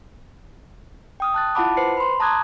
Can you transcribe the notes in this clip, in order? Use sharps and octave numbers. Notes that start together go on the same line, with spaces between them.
G5 D#6 F6
A5 F#6 A6
E4 F4 F#5 A5 B5 D6
B4 C5 C7 C#7
B5 C6
A5 A#5 D6 D#6 F#6 G#6